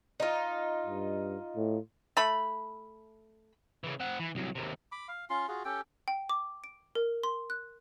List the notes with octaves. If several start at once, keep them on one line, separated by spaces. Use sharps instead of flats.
D#4 F4
G2
A2
A3 B5
C#3 E3
C4 F#5
E3
C2 F#3
D#2 C3
B5 D6
F5
C#4 F4 C6
F4 F#4 G#4
C#4 G4 A4 G5
G5
D6
D7
A#4
C6
F#6